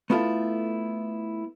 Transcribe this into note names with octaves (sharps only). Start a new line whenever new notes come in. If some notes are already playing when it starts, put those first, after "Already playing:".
A3 B3 E4 F4 A4